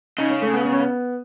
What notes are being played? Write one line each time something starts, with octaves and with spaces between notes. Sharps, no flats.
C#3 D#4
C#4
A3
B3
B3
C#4
B3